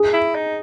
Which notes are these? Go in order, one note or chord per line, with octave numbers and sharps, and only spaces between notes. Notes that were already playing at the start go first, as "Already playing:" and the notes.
Already playing: G#4
E4
D#4